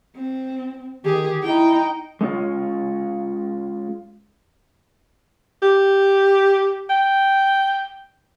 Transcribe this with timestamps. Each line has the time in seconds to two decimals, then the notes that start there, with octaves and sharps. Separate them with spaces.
0.16 C4
1.04 D#3 G4 G#4
1.43 D#4 E4 G5
2.21 G#3 C#4 F4
5.63 G4
6.89 G5